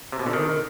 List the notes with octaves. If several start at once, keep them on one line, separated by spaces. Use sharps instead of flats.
C3
B2
D3
D#3